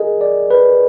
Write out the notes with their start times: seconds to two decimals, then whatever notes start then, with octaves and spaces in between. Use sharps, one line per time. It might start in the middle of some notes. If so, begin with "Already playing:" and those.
Already playing: G#4 A#4 D#5
0.21 D5
0.51 B4